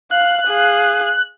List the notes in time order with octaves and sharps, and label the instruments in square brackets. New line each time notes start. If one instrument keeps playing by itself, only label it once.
[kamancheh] F5 [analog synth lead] F#6
[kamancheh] G#4 F5